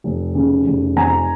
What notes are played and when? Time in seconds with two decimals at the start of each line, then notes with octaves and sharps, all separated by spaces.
0.04 F1
0.35 C#3
0.66 F1
0.96 F2 G#5 A#5